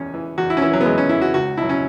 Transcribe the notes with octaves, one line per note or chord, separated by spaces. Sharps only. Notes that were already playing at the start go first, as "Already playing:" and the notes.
Already playing: E2 E3 C#4
E3
E2 F#4
E4
C#4
E3 E4
F#3
B3
E2 G#3
C#4
E3 E4
F#4
C#2 F#4
B2 F#3 E4
C#4